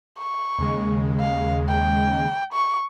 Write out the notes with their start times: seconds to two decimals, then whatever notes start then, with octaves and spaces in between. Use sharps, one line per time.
0.18 C#6
0.58 D#2 C#3 G#3
1.20 F5
1.69 G5
2.53 C#6